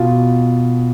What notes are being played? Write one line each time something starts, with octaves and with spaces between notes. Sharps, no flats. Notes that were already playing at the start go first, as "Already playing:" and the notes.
Already playing: B2 F4